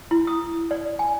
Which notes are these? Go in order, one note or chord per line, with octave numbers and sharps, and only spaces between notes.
E4
D#6
D5
G#5